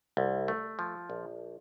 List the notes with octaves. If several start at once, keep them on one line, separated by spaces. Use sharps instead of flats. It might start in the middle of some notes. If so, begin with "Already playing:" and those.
C2
A3
F3
A#1